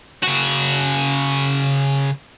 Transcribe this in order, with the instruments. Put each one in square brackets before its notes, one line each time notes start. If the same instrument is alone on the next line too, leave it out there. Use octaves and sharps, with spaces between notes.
[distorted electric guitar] C#3 F#4